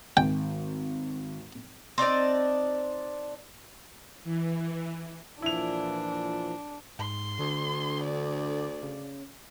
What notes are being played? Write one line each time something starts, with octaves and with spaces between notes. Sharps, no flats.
G#1 G5
C4 D4 D#4 D5
E3
A#2 E3 F3 D4 E4 F7
G#2 C6
D2 D3
D5
C#3